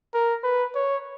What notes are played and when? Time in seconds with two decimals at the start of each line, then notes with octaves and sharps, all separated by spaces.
0.14 A#4
0.44 B4
0.75 C#5